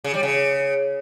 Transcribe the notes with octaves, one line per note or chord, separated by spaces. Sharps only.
C#3
G3
C#3